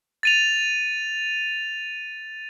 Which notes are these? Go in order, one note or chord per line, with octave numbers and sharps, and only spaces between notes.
A6 D#7 F7